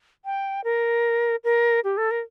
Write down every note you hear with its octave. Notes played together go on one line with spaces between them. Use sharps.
G5
A#4
A#4
G4
A4
A#4